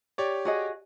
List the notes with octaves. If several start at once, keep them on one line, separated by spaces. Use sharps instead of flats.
G4 C#5 D5
F#4 G#4 D#5